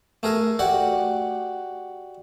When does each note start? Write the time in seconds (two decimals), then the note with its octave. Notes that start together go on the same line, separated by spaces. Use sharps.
0.23 A3 G#4 A#4
0.59 F#4 G4 D5 F#5